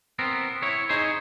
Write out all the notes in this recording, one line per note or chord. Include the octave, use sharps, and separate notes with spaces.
B3 C4 A#4
E4 C#5
D#4 G#4 C5 C#5